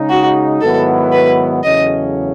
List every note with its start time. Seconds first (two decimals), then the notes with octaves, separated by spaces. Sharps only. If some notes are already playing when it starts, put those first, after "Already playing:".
Already playing: C#3 G#3 D#4
0.10 F#4
0.61 G#2 D#3 F#3 B3 E4 A4
1.12 B4
1.64 E2 C#3 F#3 A3 C#4 D#5